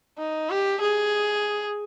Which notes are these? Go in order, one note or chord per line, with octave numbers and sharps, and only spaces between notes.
D#4
G4
G#4